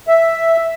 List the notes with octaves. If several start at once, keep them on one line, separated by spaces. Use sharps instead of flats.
E5